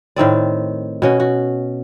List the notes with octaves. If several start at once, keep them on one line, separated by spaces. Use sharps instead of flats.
A2 D#3 C4 D5
B2 C#4 F#4
F#4